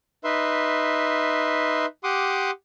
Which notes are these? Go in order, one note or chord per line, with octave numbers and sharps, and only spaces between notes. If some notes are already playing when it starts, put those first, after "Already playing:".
D#4 B4 E5 C6
G4 F#5 C6 D6 D#6